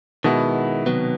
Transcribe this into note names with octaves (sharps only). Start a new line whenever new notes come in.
B2 D#3 G#3 B3 E4
C3 D#3 F#3 B3